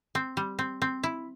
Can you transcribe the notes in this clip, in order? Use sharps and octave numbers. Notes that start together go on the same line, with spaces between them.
C4
G3
C4
C4
E4